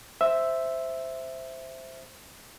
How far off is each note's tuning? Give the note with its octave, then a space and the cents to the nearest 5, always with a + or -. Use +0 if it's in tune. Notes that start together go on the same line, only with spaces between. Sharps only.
C5 +0 E5 +0